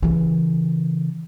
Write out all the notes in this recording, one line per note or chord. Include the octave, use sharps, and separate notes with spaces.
C#3 E3